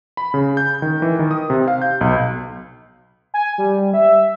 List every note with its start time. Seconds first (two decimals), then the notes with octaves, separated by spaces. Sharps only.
0.17 B5
0.34 C#3
0.57 G6
0.82 D#3
1.02 E3
1.19 D#3
1.31 D#6
1.50 C3
1.68 F5
1.82 G6
2.01 B1
3.34 G#5
3.58 G3
3.94 E5